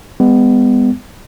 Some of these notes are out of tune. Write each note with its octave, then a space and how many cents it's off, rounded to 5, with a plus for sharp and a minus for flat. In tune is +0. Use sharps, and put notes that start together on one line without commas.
G#3 -35 B3 +20